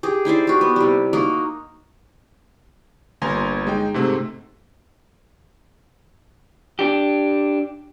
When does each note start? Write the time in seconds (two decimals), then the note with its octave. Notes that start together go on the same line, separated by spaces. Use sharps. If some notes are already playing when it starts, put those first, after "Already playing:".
0.03 G4 G#4
0.25 D#4 E4 C5 D5
0.47 F#4 G4
0.61 B3
0.76 C3 G3
1.13 A#3 D#4 F#4 A#4
3.22 G1 A#3 G#5 A#5 C6 A#6
3.67 G#3 D#4 G5
3.94 G#2 C3 A3 C4
6.79 D4 G4